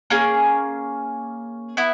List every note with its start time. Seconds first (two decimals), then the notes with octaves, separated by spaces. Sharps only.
0.10 A#3 C#4 G#4
1.77 B3 E4